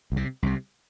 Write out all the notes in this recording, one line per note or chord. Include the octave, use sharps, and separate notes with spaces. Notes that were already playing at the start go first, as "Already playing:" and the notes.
C2 C3
C2 C3